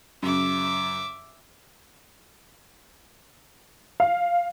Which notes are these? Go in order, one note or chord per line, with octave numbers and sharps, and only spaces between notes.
F#2 C#3 E5 D6
F5